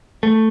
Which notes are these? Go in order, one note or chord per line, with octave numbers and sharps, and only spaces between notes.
A3